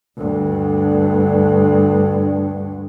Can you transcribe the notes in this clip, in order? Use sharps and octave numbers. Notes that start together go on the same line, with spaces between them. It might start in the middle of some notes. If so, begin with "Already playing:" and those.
D2 G2